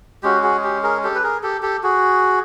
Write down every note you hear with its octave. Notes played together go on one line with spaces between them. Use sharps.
G#3 C#4 F#4 G4
F#4 G#4
G4
G#4 A#4
G4 A4
B4
G#4 A#4
G4 A4
G4 A4
F#4 G#4